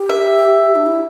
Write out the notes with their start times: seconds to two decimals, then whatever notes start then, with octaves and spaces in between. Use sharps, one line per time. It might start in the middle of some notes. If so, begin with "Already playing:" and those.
Already playing: G4
0.09 E5
0.75 D4
0.86 E4